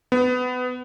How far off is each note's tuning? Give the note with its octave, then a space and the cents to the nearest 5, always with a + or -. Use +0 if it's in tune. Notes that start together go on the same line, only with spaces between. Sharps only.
B3 +20